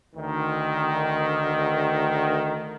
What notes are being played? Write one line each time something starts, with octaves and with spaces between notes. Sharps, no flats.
D2 D#3